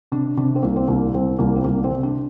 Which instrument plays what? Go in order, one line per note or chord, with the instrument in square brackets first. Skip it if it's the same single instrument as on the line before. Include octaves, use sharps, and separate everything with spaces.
[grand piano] C3 [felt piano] D4
[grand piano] C3 [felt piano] D4
[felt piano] C4
[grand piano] C2 [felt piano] A#3
[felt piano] C4
[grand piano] C2 [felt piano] A#3
[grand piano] C2 [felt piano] C4
[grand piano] C2 [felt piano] A#3
[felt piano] C4
[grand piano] C2 [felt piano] A#3
[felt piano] C4
[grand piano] C3
[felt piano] D4